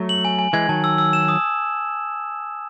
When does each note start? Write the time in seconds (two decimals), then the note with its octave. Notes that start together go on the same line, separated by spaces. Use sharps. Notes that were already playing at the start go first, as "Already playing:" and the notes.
Already playing: F#3 A3
0.09 F#7
0.25 G#5
0.39 G#5
0.53 E3 G#3 G#6
0.68 D#3 F#3 A5
0.84 E6
0.98 E6
1.13 E7
1.28 D#6